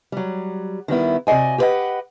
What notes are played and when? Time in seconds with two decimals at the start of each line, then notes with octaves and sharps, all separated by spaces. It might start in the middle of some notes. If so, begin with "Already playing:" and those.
0.12 F#3 G3
0.88 D#3 G3 B3 E4
1.27 C3 F#4 D5 D#5 G#5
1.58 G4 G#4 B4 C5 D#5 F#5